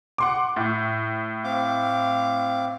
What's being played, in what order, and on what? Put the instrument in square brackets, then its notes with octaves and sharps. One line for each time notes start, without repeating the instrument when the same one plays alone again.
[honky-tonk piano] F#5 C6 D6
A2
[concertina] C4 F5 D6